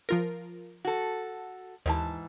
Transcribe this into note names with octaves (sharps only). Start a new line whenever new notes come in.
F3 F4 A#4
F#4 A4
D#2 G#2 E3 A5